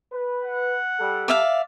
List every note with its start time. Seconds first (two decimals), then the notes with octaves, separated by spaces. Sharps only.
0.12 B4
0.43 F#5
0.99 G3 A4
1.28 D5 E5 F5